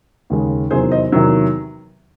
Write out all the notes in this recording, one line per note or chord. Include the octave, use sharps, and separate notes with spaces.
D#2 C#3 G#3
E2 C3 D#3 F#3 G#4 C5
C5 D#5
E2 C3 D#3 F#3